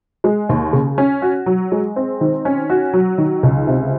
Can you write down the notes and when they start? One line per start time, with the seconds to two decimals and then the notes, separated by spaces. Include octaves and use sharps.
0.24 G#3
0.49 D#2
0.73 C#3
0.98 C#4
1.22 F#4
1.46 F#3
1.72 G#3
1.96 C4
2.21 D#3
2.45 C#4
2.70 F#4
2.93 F#3
3.18 D#3
3.43 C#2
3.67 C3